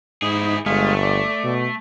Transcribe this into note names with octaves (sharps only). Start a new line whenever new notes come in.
G#2 D#4 E4 G#4
G1 G#3 A3 D#5 F5
D5
B2